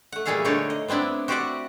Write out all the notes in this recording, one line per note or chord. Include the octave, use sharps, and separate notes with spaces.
A3 F#5
A#2 G3 A3 G#4 A4 F5
D3 A3 D4 D#4 C#5 D5
D#5
B3 C4 D4 E4 D5
F#4 G4 C5 D5 E5 F#5